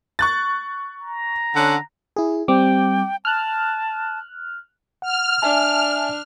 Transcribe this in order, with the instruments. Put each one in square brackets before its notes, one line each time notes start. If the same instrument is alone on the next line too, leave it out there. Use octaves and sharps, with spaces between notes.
[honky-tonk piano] C#6 F#6 A6
[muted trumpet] A#5
[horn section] D3 C#4 F#5
[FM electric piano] E4 G#4
[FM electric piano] G3 C4 D6 [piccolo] G5
[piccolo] A5 [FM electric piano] F6 F#6
[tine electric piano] F#5 [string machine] F6
[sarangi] D4 [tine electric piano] E5 G#5 A5